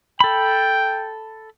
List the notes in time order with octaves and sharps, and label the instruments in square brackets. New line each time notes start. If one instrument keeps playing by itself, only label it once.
[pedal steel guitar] A4 B5 [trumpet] G5